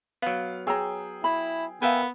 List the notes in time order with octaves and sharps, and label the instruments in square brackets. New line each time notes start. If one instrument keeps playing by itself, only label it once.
[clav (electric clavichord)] F#3 B3 [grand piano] F5
[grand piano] G#4 G5 E6 [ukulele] C#5 A#5
[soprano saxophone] E4 [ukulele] B5
[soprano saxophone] B3 [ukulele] A#4 F5 [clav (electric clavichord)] E5 G5 G#5